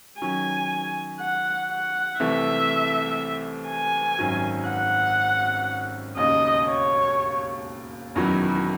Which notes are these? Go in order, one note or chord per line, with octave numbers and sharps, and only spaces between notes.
D#3 F#3 C#4 G#5
F#5
F#5
C2 C3 E3 A3 E5
G#5
G#1 F#2 D#3 F#3
F#5
E1 D#2 C#3 D#5
C#5
E1 E2 D#3 F#3 C#4 E4